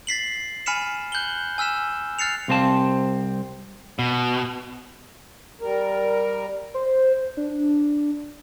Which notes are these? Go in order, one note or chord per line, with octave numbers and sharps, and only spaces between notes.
A6 B6 C7 F#7
G#5 B5 F6 B6 C#7 E7
F#6 G6 F#7 G7
G#5 E6 F6 B6 E7
F6 F#6 A6 C7 C#7 F7
C2 C3 C4 F5 A5
B2
G3 A#4
C5
D4